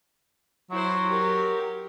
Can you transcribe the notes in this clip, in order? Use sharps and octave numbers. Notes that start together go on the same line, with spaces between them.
F#3 E4 C5
G4 A#4